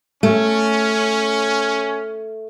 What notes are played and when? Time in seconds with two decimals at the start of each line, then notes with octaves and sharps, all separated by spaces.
0.23 A3 C#4